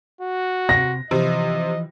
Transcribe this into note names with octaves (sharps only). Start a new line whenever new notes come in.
F#4
C3 A#6
C3 E3 F3 D#5